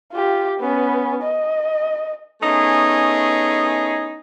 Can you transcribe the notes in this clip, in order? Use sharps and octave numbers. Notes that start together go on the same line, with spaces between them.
F4 G4
B3 C#4
D#5
A3 B3 C#4 D#4 E4 G#4